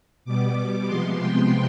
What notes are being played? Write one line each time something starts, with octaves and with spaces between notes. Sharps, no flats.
B2 G3 B3 D6
C3 F3 G#3 B3 C6
G5